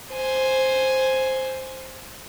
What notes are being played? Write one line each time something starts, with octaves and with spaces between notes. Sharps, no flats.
C5 G#5